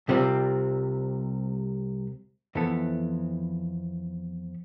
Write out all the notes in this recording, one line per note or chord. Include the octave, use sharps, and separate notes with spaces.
C2 C3 G3 C4 F4
F2 E3 B3 E4 A4